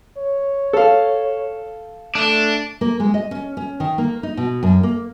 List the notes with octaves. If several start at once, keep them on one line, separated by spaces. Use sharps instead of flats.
C#5
A4 F5
A3 D4
A#3
G#3
D#5
C#4
C#4
D#3
A#3
D#4
B2
F#2
A#3